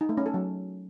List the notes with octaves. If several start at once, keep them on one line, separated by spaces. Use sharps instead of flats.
D#4
A3
C#4
A4
F#3